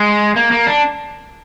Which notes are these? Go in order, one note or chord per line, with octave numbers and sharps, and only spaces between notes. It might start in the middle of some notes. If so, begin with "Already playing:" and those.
Already playing: G#3
A#3
A#3
D4